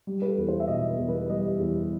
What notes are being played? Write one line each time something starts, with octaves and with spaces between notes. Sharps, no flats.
G3
B4
A4
E2
C5
E5
B2 D#5
B4
E2
B4
G3 D#5
E2